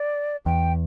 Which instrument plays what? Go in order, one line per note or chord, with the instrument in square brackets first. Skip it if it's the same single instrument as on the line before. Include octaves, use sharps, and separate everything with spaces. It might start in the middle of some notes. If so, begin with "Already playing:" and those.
Already playing: [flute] D5
[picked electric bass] E2 [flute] G5